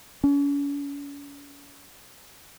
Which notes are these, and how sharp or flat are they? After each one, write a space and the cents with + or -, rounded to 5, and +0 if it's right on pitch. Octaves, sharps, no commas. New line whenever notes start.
C#4 +40